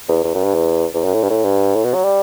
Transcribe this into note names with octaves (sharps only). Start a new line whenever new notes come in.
E2
E2
F#2
G2
E2
E2
F#2
A2
G2
A2
G2
A2
B2
F#3
G3